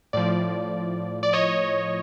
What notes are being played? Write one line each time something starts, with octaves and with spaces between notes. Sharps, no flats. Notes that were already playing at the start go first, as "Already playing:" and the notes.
A2 F3 D5
D5
C#5 D#5